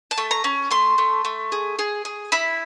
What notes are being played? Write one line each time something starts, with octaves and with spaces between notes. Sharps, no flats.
A5
A3
A#5
C#4
A3 C6
A3
A3
G#4
G#4
G#4
E4 B5